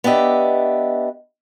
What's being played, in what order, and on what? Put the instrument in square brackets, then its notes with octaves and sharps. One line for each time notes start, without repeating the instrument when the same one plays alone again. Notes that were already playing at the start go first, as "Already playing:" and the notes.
[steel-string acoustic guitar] B3 D4 G4 D#5 E5